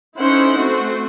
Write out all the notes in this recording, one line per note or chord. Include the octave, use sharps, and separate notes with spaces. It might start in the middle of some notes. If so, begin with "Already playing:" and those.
C#4 D#4 E4 A4 C5 F#5
A3 C4 F#4 C5